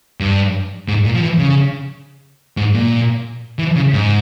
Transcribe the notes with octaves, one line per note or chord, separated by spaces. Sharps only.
G2
G#2
A#2
F3
E3
C#3
G#2
A#2
E3
C#3
G#2